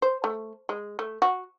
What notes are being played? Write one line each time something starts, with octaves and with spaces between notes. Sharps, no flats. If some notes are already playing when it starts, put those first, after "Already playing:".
C5
A3
G#3
A3
F#4